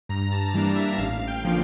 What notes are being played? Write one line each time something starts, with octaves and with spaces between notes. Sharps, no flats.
G2 A#5
A5
E3 G3 A#3 D4
E5
A1 F5
G5
D3 F3 A#3